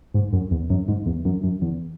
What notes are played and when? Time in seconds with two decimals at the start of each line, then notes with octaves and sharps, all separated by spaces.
0.14 G#2
0.33 F#2
0.51 E2
0.70 F#2
0.88 G#2
1.06 E2
1.25 F#2
1.43 F#2
1.62 E2